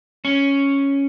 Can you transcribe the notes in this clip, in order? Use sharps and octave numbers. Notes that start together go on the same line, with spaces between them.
C#4